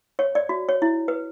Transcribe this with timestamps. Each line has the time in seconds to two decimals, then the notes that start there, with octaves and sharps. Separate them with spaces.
0.19 C#5
0.35 D5
0.49 F#4
0.69 C#5
0.82 E4
1.08 B4